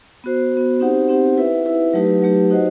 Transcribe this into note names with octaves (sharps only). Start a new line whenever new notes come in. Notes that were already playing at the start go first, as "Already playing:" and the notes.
B3 F#4 C5
B3 F#4 C5
C4 D#4 G4 C5 F#5
C4 D#4 G4 C5 F#5
E4 B4 E5
E4 B4 E5
F#3 A3 D#4 G4 B4
F#3 A3 D#4 G4 B4
D#4 F#4 C5 D#5 F#5